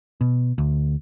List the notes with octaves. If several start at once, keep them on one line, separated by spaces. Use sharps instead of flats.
B2
D2